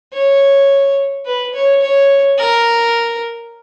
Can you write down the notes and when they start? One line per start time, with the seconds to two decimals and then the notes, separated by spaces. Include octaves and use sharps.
0.13 C#5
1.26 B4
1.54 C#5
1.82 C#5
2.39 A#4